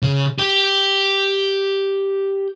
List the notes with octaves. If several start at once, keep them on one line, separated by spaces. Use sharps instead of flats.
C#3
G4 G5